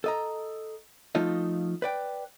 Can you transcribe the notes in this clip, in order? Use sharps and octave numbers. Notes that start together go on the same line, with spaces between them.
A4 D#5 A#5
F3 A3 D#4 F4 A4 D#5
B4 D5 G5